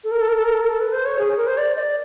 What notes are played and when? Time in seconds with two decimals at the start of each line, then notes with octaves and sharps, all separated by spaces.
0.04 A4
0.11 A#4
0.21 A4
0.29 A#4
0.36 A4
0.44 A#4
0.53 A4
0.62 A#4
0.69 A4
0.80 B4
0.93 C5
1.05 C#5
1.19 G#4
1.37 A#4
1.47 C5
1.57 D5
1.76 D#5
1.80 D5